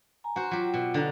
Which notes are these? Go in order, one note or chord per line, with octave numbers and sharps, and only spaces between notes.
G#5 A#5
F#4 C5
F#3 F4 G4
B2
D3 D#4